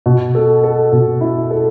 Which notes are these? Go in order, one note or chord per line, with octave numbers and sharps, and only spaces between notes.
B2
A4
A4
B2
E4
A4